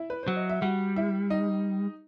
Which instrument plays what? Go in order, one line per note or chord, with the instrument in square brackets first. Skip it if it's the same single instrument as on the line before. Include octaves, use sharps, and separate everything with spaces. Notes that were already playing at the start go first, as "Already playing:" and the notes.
Already playing: [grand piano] E4 E5
B4
[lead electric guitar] F#3 [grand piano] C5
[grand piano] D#5
E5
[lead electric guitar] G3 [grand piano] F#4 F#5
[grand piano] E4 E5
D#4 D#5